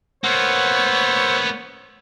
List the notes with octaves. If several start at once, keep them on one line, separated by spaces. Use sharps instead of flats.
A#3 B3 C5 C#5 F#5 E6